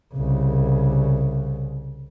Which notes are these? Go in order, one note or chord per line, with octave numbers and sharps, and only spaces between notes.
C2 C#3